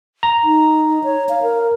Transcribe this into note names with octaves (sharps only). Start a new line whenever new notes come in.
A#5
D#4
C#5
F5
A#4